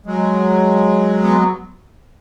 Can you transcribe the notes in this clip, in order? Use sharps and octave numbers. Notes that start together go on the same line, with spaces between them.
F#3 G#3
B3